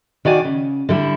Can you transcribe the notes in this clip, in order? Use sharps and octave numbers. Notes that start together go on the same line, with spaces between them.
D#3 F#4 D5 G#5
C#3
D3 G3 E4